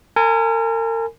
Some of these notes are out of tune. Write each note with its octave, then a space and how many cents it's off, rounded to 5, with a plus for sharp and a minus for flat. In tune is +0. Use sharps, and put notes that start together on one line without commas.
A#4 -40 G#5 +0 B5 +25